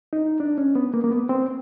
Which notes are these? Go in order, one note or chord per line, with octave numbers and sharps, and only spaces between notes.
D#4
D4
C#4
B3
A#3
A#3
B3
C4